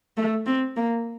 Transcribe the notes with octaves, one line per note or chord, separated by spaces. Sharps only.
A3
C4
A#3